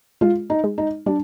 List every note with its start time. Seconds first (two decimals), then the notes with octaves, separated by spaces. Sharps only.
0.21 G#3 F4
0.50 D#4
0.64 G#3
0.78 D#4
1.06 G3 D4